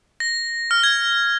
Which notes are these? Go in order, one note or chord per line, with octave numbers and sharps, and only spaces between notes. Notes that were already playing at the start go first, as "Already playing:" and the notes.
A#6
F6
G#6